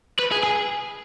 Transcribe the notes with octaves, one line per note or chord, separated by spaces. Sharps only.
B4
G#4
G#4